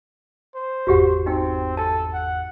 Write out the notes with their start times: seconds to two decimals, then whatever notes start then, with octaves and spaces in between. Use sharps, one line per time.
0.55 C5
0.87 G1 E2 G#2 F#4 G4 F#5
1.26 C4 D#4 G5
1.77 A4 A5
2.14 F#5